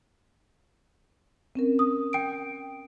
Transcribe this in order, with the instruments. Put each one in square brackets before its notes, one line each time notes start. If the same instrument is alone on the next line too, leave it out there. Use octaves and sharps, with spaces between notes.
[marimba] C4 C#4 A#4
[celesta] D#6
G5 D7